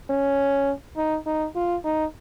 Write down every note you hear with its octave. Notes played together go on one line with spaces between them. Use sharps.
C#4
D#4
D#4
F4
D#4